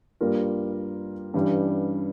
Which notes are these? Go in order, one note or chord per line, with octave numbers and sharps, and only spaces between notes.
G2 G3 A#3 F4 A#4
G2 E3 G3 C#4